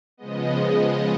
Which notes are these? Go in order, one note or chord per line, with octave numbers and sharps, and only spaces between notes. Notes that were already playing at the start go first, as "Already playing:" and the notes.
C#3 F3 G#3 B3 D#5
D#5